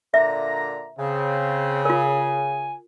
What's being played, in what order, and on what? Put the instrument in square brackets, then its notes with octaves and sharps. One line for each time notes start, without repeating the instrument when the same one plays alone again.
[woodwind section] A#2 D3 A#5 [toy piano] E5
[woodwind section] C#3 [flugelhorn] C4
[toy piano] F4 A#4 [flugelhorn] G#5